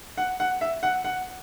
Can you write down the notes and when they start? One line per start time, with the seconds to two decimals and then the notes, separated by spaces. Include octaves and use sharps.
0.17 F#5
0.40 F#5
0.61 E5
0.83 F#5
1.04 F#5